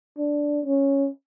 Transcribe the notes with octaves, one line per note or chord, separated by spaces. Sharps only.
D4
C#4